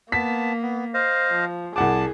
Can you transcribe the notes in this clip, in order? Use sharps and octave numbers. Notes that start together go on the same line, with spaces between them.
A#3 B3 A5 B6
B3
C5 D#5 F5
F3
C2 G#4 F#5 A5 D6